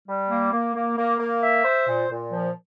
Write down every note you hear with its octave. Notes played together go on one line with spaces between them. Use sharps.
G3
A#3
A#3
A#3
A#3
A#3
E5
C5
A#2
A#2
F3